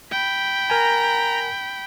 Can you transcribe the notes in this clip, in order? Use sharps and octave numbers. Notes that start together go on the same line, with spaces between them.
G5 B5
A#4 G#5 A#5